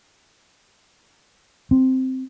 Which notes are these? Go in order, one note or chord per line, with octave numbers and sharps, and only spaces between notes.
C4